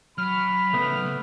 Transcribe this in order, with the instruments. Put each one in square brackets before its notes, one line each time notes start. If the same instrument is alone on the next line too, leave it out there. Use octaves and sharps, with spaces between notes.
[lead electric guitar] F#3 [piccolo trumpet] B5 [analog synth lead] F6
[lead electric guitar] C#3 D5 [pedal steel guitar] A3 B3